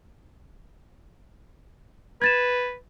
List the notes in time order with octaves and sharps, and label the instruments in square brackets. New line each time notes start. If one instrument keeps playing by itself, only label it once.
[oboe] B4 [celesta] G#6 A6 E7